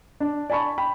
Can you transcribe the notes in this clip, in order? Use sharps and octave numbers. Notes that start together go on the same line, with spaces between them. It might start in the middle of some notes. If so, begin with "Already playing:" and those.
D4
D5 G#5 A5 B5 C#6
G5 B5